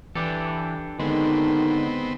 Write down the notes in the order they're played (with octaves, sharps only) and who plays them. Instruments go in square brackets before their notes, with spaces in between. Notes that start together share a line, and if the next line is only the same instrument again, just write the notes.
[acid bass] E3 [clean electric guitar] D4 G4 A4
[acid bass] D3 [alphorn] D#3 [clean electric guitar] G#3 [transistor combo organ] B3 C4